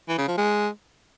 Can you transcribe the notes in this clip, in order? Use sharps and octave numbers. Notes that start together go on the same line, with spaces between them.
E3
C#3
F3
G#3